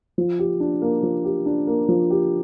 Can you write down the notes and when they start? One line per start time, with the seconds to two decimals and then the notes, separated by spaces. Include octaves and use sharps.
0.18 F3
0.39 G4
0.60 D4
0.82 A#3
1.03 F3
1.25 G4
1.46 D4
1.67 A#3
1.89 F3
2.10 G4